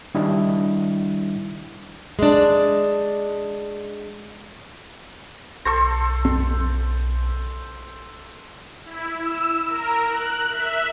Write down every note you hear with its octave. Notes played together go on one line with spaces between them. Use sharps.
D#3 G3 D4 E4 D#5
G#3 D4
B1 A4 C5 C#6 A#6
F2
E4
E6
A#4
F#6
E5